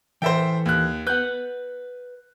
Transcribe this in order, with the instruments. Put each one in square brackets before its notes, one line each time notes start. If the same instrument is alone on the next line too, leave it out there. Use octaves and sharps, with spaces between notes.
[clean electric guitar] E3 A4 [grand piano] C5 E5 G5
[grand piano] D#2 F#6
[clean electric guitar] B4 F#5 [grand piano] F#6 G6